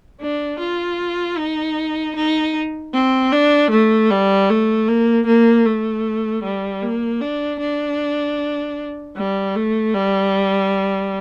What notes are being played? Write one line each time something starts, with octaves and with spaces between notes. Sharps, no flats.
D4
F4
D#4
D#4
C4
D4
A3
G3
A3
A#3
A#3
A3
G3
A#3
D4
D4
G3
A3
G3